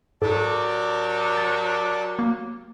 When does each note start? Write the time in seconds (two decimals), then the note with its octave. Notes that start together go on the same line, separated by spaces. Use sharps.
0.22 G#2 F#3 G4 A4 A#4 D5 A5 D6
1.37 A6
2.19 A#3